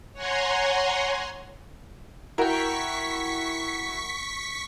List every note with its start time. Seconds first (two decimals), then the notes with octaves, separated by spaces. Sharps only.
0.13 C#5 F#5 G#5 A#5 C6
2.38 E4 F#4 A#4 G5 C#6 B6